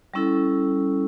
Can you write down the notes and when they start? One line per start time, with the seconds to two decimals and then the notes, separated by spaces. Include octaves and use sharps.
0.14 G3 C#4 E4 A4